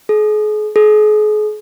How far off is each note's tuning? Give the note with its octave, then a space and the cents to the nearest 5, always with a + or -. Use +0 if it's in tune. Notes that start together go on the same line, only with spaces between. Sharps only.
G#4 +40
G#4 +40